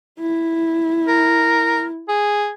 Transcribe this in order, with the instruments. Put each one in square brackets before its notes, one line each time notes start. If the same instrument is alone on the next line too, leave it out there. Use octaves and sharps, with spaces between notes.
[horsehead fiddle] E4
[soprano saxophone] A#4
G#4